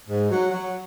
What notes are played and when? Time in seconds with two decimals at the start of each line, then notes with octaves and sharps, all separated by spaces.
0.09 G#2
0.31 F#3
0.51 F#3